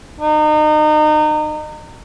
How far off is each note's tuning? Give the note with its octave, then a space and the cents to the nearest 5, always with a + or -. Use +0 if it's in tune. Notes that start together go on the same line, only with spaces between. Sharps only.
D#4 -30